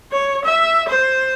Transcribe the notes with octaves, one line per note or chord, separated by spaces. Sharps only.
C#5
E5
C5